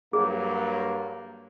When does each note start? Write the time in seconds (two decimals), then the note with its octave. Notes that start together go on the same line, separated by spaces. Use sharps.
0.13 G2 F#3 A#3 G#4